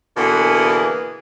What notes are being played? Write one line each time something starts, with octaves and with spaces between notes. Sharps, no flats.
B2 D3 E3 A#3 G#4 F#5